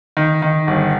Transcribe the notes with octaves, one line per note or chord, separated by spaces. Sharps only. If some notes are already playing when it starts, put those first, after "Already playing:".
D#3
D#3
G1